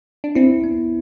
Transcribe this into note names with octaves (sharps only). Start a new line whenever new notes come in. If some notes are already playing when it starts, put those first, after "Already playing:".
D4
C4 E4
B3